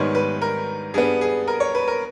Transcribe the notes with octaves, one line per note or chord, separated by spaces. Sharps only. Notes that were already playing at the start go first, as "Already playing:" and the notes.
Already playing: G#2 D#3 G3 B3 C#5
B4
A#4
G2 G3 B3 G#4
G#4
A#4
C#5
B4
A#4